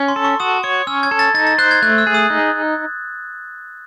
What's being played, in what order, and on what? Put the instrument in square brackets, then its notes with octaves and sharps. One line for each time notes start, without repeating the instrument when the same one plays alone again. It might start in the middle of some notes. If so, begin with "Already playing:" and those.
Already playing: [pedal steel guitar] C#4
[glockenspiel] C6
[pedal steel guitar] A4
[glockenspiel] C#6
[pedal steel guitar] F#4 [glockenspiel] D#6
[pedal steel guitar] C#5 [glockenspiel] C#6
[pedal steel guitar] C#4 [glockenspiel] E6
[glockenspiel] G#6
[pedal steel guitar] A4
[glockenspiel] A6
[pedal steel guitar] D#4 [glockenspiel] A6
[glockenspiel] A6
[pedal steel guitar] C5 [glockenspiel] F#6
[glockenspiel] G#6
[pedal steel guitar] A3 [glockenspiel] F#6
[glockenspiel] E6
[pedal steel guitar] G#4
[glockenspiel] D#6
[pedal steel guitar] D#4